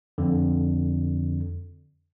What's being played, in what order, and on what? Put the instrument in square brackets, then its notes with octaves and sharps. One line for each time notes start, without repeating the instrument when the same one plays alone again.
[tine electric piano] F2 D3